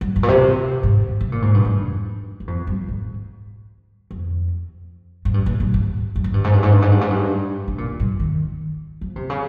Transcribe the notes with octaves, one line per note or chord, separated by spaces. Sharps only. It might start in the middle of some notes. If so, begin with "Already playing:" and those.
G2
G#2
A#2
C3
G#2
C3
A#2
G#2
G2
F2
G2
F2
G2
G#2
F2
G#2
G2
A#2
G2
G#2
G2
G#2
G2
G#2
G2
G#2
G2
G#2
G2
G#2
G2
C3
A#2
G2
D#3
F3
C3
C#3